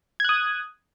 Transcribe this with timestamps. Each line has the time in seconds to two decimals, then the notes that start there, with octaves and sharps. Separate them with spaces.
0.20 G#6
0.25 F#6
0.29 D#6